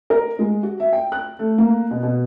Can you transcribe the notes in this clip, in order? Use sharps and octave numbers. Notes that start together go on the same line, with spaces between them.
A#4
G#3
F#4
E5
G5
F#6
A3
A#3
B2
B2